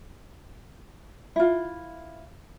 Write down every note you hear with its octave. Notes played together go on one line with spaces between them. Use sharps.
E4 F4